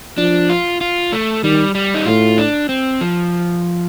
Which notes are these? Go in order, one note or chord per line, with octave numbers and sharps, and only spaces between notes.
F3 D4
F4
F4
A3
D#3 G3
G3
D#4
A2 F4
D4
C4
F3